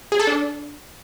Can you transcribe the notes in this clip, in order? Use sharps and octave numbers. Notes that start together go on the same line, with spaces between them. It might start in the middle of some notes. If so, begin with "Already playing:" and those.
G#4
A4
D4